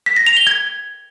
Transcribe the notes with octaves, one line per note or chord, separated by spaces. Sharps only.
B6
A#6
F7
G7
G#6